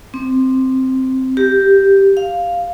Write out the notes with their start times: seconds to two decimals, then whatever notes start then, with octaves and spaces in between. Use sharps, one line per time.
0.14 C4
1.37 G4
2.17 F5